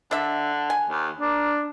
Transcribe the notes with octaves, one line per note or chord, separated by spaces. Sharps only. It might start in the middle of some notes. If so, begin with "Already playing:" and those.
D3 D4 E5
G#5
D#2
A#3 D4